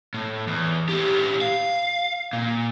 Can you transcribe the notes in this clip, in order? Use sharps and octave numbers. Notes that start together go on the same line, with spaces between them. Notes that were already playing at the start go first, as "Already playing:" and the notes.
A2
E2
A2 G4
F5
A#2